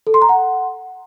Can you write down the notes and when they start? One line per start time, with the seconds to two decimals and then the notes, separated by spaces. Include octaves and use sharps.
0.07 A4
0.14 C6
0.22 A#5
0.29 F#5